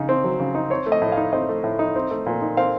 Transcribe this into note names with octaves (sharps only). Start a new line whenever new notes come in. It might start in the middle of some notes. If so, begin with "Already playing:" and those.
Already playing: C#3 D#4
C4
F#3
C#3
D#4
C4 C#5
A3
D#5
A2
D#4 F5
C4 D#5
A3
A2
D#4
C4
A3
A#2
D#4
C4 F5